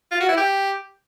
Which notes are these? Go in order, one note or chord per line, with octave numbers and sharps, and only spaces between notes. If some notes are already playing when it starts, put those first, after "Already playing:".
F4
F#4
E4
G4